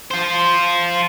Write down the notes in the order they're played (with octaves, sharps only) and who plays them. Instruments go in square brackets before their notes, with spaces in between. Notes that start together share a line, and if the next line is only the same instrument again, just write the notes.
[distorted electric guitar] F4 C5